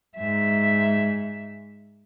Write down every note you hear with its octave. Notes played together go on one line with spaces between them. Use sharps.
G#2 E5